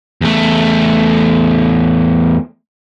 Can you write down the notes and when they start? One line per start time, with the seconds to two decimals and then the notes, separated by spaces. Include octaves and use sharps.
0.21 E2 A3